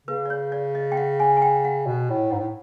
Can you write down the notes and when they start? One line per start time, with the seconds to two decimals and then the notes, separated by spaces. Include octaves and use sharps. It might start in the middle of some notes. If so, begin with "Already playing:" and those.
0.07 C#3 B4
0.26 D5
0.30 C#5
0.52 D5
0.75 D#5
0.92 G5
0.97 F#5
1.20 G#5
1.37 G#5
1.42 G5
1.65 F#5
1.87 B2
2.10 A2
2.31 G#2
2.39 A2